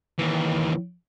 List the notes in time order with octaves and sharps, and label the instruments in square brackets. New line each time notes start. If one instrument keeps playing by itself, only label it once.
[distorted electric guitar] D#2 E3